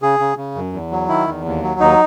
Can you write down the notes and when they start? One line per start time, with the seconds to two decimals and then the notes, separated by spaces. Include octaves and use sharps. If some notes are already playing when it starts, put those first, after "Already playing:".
0.02 C#3 G#4
0.19 C#3
0.37 C#3
0.55 F#2
0.73 E2
0.91 F#3
1.08 D#3 E4
1.27 E2
1.45 D#2
1.62 F#3
1.80 D#2 D#4